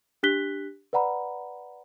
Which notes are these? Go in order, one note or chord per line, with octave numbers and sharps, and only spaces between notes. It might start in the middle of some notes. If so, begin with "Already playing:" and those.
D4 G4 F#6 B6 G7
B4 D5 F#5 A#5 B5